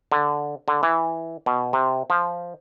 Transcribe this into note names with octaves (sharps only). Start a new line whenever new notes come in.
D3
D3
E3
B2
C3
F3